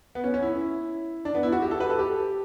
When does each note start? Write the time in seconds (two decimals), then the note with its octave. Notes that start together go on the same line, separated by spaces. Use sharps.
0.15 B3
0.24 C#4
0.34 C#4
0.43 E4
1.25 D4
1.35 B3
1.43 E4
1.52 F#4
1.62 G4
1.71 A4
1.80 B4
1.90 A4
1.99 G4